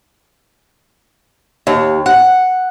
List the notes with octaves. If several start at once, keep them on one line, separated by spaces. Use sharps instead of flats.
D#2
F#5